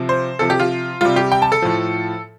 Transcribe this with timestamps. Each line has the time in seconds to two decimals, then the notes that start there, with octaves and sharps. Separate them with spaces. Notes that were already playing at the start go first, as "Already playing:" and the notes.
Already playing: C3 F3
0.09 C5
0.39 C3 F3 A4
0.50 G4
0.60 F4
1.01 C3 G3 F4
1.16 G4
1.32 G5
1.42 A5
1.52 A4
1.62 A2 F3